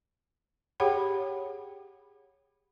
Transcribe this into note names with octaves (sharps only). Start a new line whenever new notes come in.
G4 G#4 C#5 F#5 G5 B5